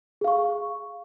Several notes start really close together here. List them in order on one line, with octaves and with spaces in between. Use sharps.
G#4 F5 C#6